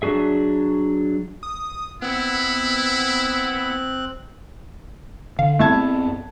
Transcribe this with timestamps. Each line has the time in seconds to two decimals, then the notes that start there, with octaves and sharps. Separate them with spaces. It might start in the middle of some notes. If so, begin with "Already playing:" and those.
0.02 F#3 D4 F#4 G#4 E5
1.43 D#6
2.02 B3 C4 E4 F#6
5.39 D3 F5
5.59 F#2 A3 B3 C4 E4 A5 G#6